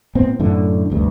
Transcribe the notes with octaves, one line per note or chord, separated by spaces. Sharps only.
A2 B3 C4
F#2 A2 D3
F1 D2 G2